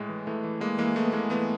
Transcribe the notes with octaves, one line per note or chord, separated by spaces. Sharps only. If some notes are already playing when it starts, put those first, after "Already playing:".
Already playing: A2 G#3
E3
E3 A3
E3
E3 G#3 A#3
E3 G#3 A#3
E3 A3
B3
E3 G#3 A#3
E3 A3 B3